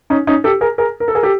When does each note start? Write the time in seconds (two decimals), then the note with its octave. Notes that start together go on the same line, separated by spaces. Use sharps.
0.10 C#4 D#4
0.27 C#4 D#4
0.44 G4 A4
0.61 G#4 A#4
0.78 G#4 A#4
1.00 A#4
1.08 A4
1.15 G#4 A#4
1.23 G4 A4